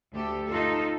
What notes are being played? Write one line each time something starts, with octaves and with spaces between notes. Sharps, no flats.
D2 G4 A4
D#4 F4 A4